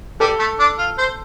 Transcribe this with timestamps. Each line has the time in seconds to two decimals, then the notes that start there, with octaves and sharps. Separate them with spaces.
0.20 G3 A4
0.39 A3
0.59 D4
0.78 F4
0.98 C5